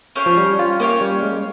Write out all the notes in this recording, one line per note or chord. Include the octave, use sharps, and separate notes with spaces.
C#4 G4 C#5 F5
F3
G3
F4
A#3 C#4 G4 C#5 F5
G3
G#3